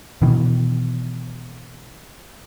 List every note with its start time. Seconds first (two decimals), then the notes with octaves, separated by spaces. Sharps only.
0.22 B2 D#3 E3